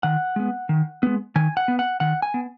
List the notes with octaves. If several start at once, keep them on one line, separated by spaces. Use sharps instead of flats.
D#3 F#5
G#3 B3
D#3
G#3 B3
D#3 G#5
F#5
B3
F#5
D#3 F#5
G#5
B3